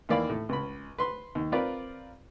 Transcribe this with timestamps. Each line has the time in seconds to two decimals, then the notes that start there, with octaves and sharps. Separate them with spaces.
0.09 D#2 E3 A#3 D5 F5 B5
0.29 A2
0.49 C#2 B5
0.98 B4 C6
1.35 D#2
1.52 C4 F4 A#4 B4 D5